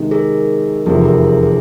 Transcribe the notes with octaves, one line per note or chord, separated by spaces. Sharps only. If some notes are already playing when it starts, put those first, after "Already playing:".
Already playing: C3 D#3 G#3
G#4 A#4
F1 E2 C3 F3 G#4 A#4
G#4 A#4
G#4
G#4